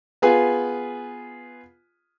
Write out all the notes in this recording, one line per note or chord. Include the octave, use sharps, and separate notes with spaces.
B3 F4 G#4 B4 G#5